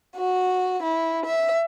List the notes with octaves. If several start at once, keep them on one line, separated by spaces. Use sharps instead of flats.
F#4
E4
E5